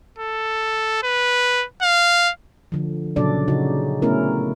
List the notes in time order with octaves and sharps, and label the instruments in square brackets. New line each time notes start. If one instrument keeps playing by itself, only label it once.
[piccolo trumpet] A4
B4
F5
[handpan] D3 F3
A#2 C#3 F#3 D4 A4 D5
C#3 D#4 F#4
A3 B3 C#4 E4 A#4